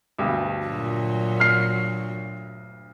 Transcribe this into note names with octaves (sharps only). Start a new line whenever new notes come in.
D2 G2 B2
A#2 F#3
F6 C7